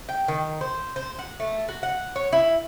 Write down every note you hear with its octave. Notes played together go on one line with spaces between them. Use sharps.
G5
D#3
C5
C5
F#5
A3
F#4
F#5
C#5
E4